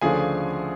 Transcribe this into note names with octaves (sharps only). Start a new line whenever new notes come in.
D2 C#3 F3 A3 D4 G#4 G#5